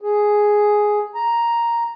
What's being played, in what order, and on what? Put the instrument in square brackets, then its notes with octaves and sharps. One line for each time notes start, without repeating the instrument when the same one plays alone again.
[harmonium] G#4
A#5